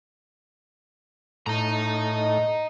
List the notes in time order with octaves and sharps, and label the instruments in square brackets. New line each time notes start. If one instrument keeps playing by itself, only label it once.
[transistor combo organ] A2 [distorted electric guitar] D#5 A#5